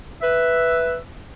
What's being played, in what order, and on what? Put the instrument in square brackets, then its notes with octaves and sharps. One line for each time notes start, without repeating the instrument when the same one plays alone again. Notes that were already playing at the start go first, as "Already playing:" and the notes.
[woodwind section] B4 E5